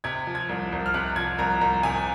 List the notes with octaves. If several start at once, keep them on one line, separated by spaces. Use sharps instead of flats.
C3 G#6
F3
G#6
C2
C2
F6
C3 F#6
F3 G#6
C2 A#5
C2 A#5
C3 G#5